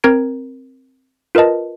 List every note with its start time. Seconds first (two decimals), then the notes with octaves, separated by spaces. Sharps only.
0.04 C4 A#4 A#5 G#6 D7
1.35 F4 A#4 B4 D#5 A5